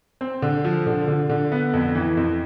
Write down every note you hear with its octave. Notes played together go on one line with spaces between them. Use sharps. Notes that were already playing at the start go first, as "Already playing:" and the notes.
C4
D3
F3
D3
D3
D3
B3
F2
E3
F2